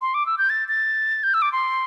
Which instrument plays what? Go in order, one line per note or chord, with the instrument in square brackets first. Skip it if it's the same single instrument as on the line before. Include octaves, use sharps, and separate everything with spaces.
[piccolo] C6
D6
E6
G6
A6
A6
G6
E6
D6
C6